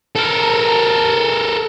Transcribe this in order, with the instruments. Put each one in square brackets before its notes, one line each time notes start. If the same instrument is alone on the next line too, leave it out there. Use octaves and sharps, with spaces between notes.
[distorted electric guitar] A4 A#4